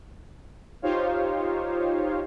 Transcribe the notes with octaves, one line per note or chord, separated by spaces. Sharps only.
D#4 F4 G4 C5 C#5 F5